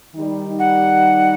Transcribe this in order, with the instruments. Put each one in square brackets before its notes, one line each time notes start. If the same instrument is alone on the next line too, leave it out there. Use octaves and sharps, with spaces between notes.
[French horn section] D#3 G3 D#4
[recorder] F#5